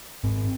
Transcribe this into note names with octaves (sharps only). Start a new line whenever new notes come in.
G#2 C4